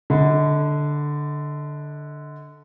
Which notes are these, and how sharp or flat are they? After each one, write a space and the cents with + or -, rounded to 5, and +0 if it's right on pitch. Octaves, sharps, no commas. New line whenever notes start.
D3 +0 D#5 +35 B5 +0